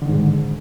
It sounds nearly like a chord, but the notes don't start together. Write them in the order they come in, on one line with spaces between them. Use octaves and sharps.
D3 D#3 G#2